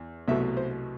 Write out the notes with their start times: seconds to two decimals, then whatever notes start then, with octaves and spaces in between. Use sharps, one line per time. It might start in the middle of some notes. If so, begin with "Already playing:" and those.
Already playing: E2
0.28 C2 B2 F#3 A3 E5
0.57 C5